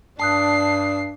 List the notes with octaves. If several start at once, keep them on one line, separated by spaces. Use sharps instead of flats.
G2 D4 A5 D#6 F#6 C7